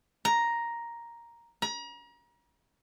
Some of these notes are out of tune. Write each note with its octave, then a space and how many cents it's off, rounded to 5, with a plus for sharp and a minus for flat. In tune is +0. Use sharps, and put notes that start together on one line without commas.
A#5 +5
A#5 +40